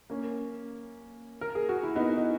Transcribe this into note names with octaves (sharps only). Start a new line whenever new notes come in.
A#3 C#4
A#4
G#4
F#4
E4
B3 D#4
D#4